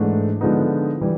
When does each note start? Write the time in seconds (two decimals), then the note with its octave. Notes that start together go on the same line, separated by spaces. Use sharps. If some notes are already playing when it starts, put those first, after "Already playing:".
Already playing: G#2 E3 A3 D4
0.41 D3 F3 G#3 B3 D#4
1.01 E3 G3